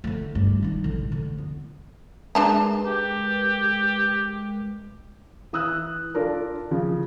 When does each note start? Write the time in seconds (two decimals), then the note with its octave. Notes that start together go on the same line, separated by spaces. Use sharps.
0.04 D3 A3
0.35 G2
0.62 D#3 D#4
0.84 A1 D3
1.12 D3
1.38 B3
2.35 G#3 D4 A#4 B4 A5 A#5
2.86 G4
5.53 E3 D#6 E6 F#6
6.15 D4 F4 A4 A#4
6.71 C#3 F3